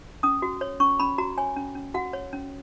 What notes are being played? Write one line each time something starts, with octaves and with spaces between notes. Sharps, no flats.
C#4 D#6
F#4
C#5
C#4 C#6
C#4 B5
F#4 A#5
C#5 G#5
C#4
C#4
F#4 F#5
C#5
C#4